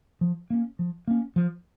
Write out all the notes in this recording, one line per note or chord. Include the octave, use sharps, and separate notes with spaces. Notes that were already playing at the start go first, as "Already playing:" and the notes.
F3
A#3 C#4
F3
A#3 C#4
F3